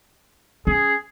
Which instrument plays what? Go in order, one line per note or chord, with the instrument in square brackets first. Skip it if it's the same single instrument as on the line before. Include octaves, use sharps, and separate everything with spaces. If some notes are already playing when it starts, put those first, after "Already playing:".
[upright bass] C#4 [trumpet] G#4